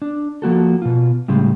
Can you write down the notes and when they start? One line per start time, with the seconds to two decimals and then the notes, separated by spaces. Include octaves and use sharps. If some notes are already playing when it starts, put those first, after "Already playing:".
0.02 D4
0.42 F3 A#3 F#4 A4
0.82 B2 F4
1.28 A2 C#3 G3 G#3